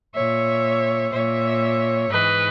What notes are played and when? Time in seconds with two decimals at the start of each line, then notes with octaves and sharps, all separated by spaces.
0.14 A#2 C#5 E5
1.13 A#2 C#5 E5
2.10 G#2 E3 B4 D#5